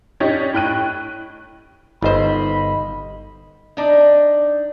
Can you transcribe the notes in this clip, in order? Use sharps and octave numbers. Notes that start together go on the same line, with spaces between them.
C#4 D4 G4 C#5 D#5
A2 G5 F#6 D#7
G1 D#4 C5 D#5 B5
D4 D#4